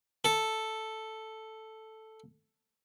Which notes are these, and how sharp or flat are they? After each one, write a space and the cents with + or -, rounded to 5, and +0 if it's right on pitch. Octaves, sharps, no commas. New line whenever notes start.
A4 +0